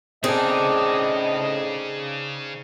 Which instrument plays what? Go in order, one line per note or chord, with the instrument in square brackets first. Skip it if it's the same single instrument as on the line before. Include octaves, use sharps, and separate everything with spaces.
[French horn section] A2 D#5 [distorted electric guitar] C#3 G#5 [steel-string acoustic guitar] C4 D4 [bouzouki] D#4 G#4